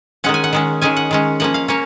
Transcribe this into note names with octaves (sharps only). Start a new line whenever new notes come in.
D#3 G#3 C#4 F#5
G#5
F#5
D#3 G#3 C#4
D#3 G#3 C#4 G#5
F#5
D#3 G#3 C#4
F3 A#3 C#4 F#5
F5
A#3 C#4 C#5